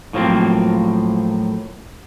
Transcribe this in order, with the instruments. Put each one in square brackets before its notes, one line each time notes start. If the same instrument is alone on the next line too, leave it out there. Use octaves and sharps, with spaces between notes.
[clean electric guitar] A2 F3 F#3 A#3 C4